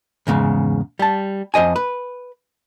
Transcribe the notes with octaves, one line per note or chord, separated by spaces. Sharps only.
E2 G#2 C#3 G#3
G3 A5
F2 C5 D#5 G#5
B4